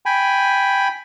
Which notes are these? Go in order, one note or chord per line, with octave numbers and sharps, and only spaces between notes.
G5 G#5 B5